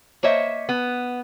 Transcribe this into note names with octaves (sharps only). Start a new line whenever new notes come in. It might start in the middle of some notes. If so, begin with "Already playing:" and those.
A#3 C5 C#5 D#5 E5
B3